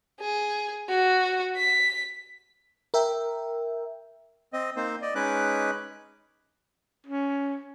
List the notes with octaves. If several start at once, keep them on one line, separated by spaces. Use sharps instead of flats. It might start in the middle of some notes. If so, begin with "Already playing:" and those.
G#4
F#4
B6
A#4 E5 G5
C4 D#5
A#3 C4 D#4 C5
D5 D#5
G#3 C#4 D#4 B4 D6 F#6
C#4